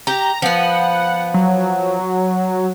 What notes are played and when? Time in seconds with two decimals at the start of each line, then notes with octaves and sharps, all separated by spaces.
0.07 G4 A#5
0.42 F3 B3 F#5
1.34 F#3